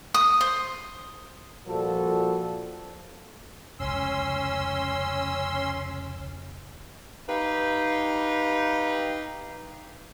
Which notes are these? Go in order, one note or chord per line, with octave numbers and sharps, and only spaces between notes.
D#6
C5
A#2 F3 G3 F#4 A4
F1 C#2 C#4 C6 E6
D#4 G4 B4 F5